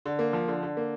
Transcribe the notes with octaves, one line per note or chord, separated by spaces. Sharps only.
D3
A#3
F3
D3
D3
A#3